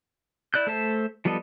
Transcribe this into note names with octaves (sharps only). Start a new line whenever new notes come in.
E4 D5 F#6 G6
A3 A4 C5 E5 A5
F3 G3 B3 A4 D#5